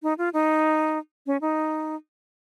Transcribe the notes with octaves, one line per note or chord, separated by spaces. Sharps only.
D#4
F4
D#4
C#4
D#4